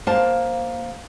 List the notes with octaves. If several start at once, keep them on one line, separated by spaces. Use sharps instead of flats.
A#3 C5 F5 A5